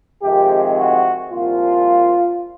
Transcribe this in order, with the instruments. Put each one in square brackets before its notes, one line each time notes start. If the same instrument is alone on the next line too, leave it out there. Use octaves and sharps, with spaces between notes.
[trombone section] F2 C3 D#3 G#3 G4
F#4
C2 A#2 F3 F4